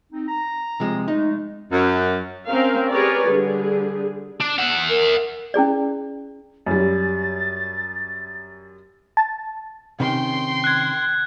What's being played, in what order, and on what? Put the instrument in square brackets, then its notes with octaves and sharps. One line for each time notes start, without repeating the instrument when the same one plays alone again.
[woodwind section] C4 D#4
A#5
[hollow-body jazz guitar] C3 F3 G#3
[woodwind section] G#3 A3 [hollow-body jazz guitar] D#4
[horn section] F#2
[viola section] C4 C#4 A#4 F5
G4 G#4 A#4 B4 C#5 D5
D3 G3 G#4
[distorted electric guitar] D4
E5 F#5
[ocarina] A#4
[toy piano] C#4 E4 G#4 D5
[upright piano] F#2 G3 [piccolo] A6
[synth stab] A5
[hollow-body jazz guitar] C3 D#3 C#4 [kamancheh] G5 C6
[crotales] F#6 G#6